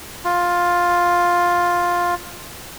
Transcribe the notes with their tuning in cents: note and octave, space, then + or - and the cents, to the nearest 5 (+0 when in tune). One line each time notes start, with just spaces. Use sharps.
F4 +10